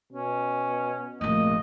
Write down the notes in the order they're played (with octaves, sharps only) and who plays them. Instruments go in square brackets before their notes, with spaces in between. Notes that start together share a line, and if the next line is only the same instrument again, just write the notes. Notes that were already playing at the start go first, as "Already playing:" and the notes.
[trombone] B2 [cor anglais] C#4
[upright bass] F1 A#1 [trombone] A#3 [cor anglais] D#5